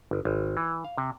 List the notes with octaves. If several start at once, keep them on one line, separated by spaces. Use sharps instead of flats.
G1
G#1
E3
F5
C3